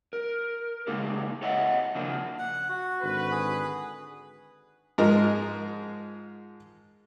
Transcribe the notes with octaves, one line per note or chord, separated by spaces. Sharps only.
A#4
C#3 G#3 A#3 D#4 G4 G#4
A4 C#5 D#5 E5 F#5
C#3 F3 A#3 D4
F#5
F#4
G#1 D3 B4
G#4
G#2 F3 G#3 A#4 D#5